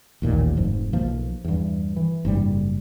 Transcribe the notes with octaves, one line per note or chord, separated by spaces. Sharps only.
A1 D#2 A#2 D#3
F1 G#2 F3
B1 F3 A#3
E2 G2
E3
F#1 G#2 G3